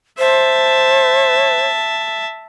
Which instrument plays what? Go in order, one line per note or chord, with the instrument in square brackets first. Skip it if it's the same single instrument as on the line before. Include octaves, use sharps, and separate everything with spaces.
[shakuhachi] C5 [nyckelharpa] E5 A5